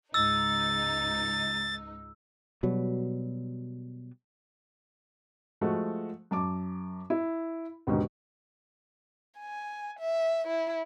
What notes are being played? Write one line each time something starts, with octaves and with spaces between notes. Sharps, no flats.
C#2 G#2 D#4 E6 A6
B2 F#3 G3
F3 G#3 A3 F#4
F#2 A5 D6
E4
D#2 G#2 B2 D3
G#5
E5
E4